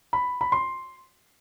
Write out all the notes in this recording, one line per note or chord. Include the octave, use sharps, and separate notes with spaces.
B5
B5
C6